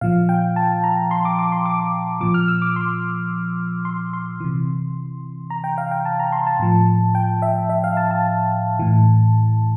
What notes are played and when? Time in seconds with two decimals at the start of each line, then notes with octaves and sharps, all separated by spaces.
0.01 A#2 F3 F5
0.29 G5
0.56 A5
0.84 A#5
1.11 C6
1.25 D6
1.39 D6
1.52 C6
1.66 D6
2.20 A#2 F3 D6
2.34 F6
2.48 E6
2.62 D6
2.76 C6
3.85 C6
4.13 C6
4.40 C3 E3
5.50 A#5
5.64 G5
5.78 F5
5.91 G5
6.05 A5
6.19 A#5
6.32 C6
6.47 A5
6.59 A2 F3
7.15 G5
7.42 E5
7.69 E5
7.84 F5
7.97 A5
8.11 A5
8.79 A2 E3